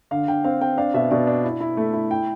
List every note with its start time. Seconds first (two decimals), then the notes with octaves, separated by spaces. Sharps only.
0.11 D3 F5
0.28 D3 G5
0.44 C4 F5
0.61 C4 G5
0.78 D4 F5
0.94 B2 E5
1.11 B2 D5
1.27 D4
1.44 E4
1.60 E4
1.77 A3
1.93 E4
2.10 E4 G5